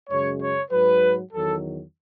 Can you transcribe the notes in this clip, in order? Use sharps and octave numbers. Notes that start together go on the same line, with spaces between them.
F#2 C#3 G#3 C#5
C#5
G#2 F#3 B4
E2 D#3 F#3 A4